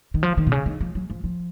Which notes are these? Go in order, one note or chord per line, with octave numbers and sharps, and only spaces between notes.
D#3
F3
D#3
B2
C#3
D#3
F3
F#3
F3
F3